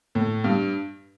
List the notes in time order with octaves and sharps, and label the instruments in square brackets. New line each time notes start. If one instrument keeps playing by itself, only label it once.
[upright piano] A2
G2